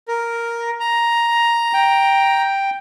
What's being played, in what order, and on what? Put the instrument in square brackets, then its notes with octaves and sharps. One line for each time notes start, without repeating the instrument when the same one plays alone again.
[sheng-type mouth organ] A#4
A#5
[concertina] G5